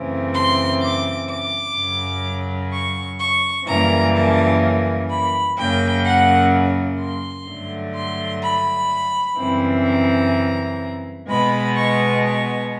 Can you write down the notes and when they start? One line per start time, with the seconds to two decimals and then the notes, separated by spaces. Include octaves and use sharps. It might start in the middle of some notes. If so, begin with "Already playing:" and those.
Already playing: F#2 C#3 E3 A3 C4
0.34 C6
0.81 D6
1.29 D6
1.76 F#2 C#3 F#3
2.72 C#6
3.19 C#6
3.66 F#2 C#3 E3 G3 A#3 A#5
4.14 A5
5.10 B5
5.57 F#2 C#3 F#3 A#3 G5
6.05 F#5
7.00 C6
7.47 G2 D3 F#3 A3
7.95 C6
8.43 B5
9.37 F#2 C#3 E3 G3 C4
9.85 A#5
11.28 B2 G#3 B3 B5
11.75 C#6
12.23 C#6